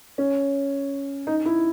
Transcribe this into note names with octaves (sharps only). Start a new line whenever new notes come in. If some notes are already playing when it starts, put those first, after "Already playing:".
C#4
D#4
E4